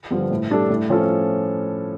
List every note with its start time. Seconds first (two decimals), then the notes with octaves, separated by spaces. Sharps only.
0.11 G2 D3 F3
0.31 A2
0.50 G3 D4 A4
0.70 A2
0.89 F3 C#4 F4 A4